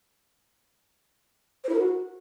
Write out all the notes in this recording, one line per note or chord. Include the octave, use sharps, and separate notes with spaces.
C5
E4
A#4
F#4